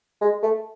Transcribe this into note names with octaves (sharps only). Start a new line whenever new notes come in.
G#3
A3